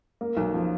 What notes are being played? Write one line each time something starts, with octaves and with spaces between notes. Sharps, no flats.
A#3
B1
F3